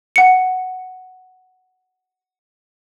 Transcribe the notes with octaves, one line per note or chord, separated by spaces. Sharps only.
F#5 C#7